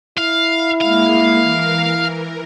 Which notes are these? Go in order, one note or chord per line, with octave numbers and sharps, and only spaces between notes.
E4 F5
G#3 A#3 F5
E3 A#4